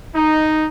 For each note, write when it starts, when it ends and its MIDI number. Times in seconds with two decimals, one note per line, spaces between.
0.15 0.66 63